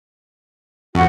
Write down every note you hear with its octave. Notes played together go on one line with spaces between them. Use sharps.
F2 F#4